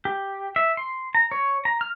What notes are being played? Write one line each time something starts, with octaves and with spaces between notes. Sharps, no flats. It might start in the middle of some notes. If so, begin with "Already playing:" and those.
G4
E5
C6
A#5
C#5
A#5
F6